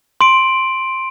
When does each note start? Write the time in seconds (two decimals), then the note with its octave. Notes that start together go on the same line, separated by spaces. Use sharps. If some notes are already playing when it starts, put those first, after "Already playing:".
0.21 C6 D7